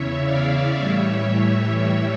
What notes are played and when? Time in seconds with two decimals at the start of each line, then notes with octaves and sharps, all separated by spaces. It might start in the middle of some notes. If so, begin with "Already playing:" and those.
Already playing: E2 C#3 E3 C#5 E5
0.24 D5 F5
0.79 A2 E3 G3 C#5 E5